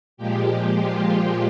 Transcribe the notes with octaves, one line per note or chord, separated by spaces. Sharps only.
A#2 F3 G#3 G4
F4